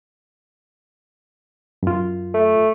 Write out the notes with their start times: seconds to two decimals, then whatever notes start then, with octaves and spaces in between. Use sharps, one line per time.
1.83 F#2 F4
2.34 A3